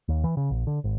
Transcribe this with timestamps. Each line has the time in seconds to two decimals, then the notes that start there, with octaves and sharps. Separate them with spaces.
0.08 D#2
0.24 E3
0.37 C#3
0.50 A#1
0.67 D3
0.84 G#1